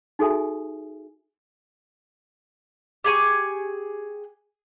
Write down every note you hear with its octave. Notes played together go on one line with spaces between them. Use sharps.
D#4 F#4 G#4 A4 E5 G#5
G4 G#4 G#5 C#6